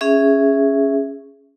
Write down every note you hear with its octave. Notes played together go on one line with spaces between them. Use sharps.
C#4 G#4 E5